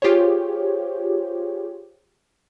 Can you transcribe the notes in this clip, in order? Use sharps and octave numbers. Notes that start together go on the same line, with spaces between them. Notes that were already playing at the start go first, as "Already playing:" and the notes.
F4 G4 G#4 C5 C#5